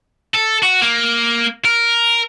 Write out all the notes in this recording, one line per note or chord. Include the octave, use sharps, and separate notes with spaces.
A4
F#4
A#3
A#4